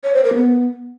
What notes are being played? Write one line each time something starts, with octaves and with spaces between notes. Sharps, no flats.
C#5
C5
A#4
B3